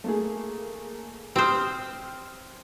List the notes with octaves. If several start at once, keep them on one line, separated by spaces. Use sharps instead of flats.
A3 A#3 G#4
C4 G4 C5 D#6 F6